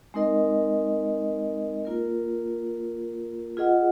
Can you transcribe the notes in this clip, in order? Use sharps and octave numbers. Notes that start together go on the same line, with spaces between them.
G#3 C4 D#4 A#4 D#5
A#3 F4 A#4
F4 G#4 D#5 F#5